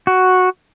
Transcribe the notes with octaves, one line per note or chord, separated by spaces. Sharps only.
F#4